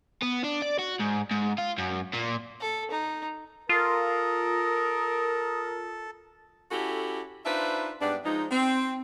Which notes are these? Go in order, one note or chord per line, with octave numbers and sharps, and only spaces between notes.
B3
D4
D5
F#4
G#2
G#2
F4
F#2
A#2
A4
D#4
F4 A4 A#4 D#6
C#4 E4 F#4 G4 A4
D4 D#4 F4 B4 C5 E5
G#2 G3 B3 D4
F3 G#3 D#4
C4